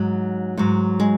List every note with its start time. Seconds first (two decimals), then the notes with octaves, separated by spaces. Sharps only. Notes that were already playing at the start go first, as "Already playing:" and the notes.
Already playing: G#2 F#3
0.57 G#2 F#3
1.00 G#3